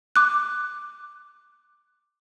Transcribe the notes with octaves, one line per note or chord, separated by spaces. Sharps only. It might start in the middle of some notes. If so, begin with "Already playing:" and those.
D6 F#6